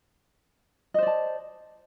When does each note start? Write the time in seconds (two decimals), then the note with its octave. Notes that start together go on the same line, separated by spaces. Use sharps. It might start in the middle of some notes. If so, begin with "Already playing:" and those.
0.94 D#5
0.98 C5
1.03 D5
1.07 A5